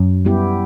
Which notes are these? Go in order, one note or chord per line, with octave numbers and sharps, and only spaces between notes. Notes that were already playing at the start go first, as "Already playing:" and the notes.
Already playing: F#2 F#3
G3 B3 E4 G4